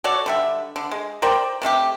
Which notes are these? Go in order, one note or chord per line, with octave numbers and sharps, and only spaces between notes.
F#4 A4 C#5 D5
D3 G3 E5
D3
G#3
A#4 C5 D5 G5
C3 A3 F4 G4